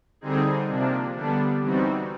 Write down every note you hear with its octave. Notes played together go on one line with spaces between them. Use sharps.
D3 G3 C4 D#4 G#4
C3 F3 A#3 D4
D3 G3 B3 D4
E3 G3 C4 D#4 F#4